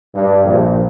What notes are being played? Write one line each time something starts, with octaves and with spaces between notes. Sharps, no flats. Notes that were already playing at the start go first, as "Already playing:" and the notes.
G2
A#1